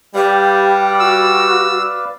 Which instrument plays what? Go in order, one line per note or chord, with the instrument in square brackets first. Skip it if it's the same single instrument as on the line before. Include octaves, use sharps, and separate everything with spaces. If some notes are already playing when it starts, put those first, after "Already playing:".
[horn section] G3 [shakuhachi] G4 [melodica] B4 D5 F5
[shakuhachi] F#4 [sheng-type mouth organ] E6